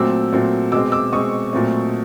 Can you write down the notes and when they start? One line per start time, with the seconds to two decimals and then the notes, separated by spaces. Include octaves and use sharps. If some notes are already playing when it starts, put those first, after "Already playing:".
Already playing: A#2 F#3 A3 C4 D6 E6
0.33 A#2 F#3 A3 C4
0.72 B2 G#3 C4 D6 E6
0.92 D6 E6
1.12 B2 G#3 C4 C#6 D#6
1.53 A#2 F#3 A3 C4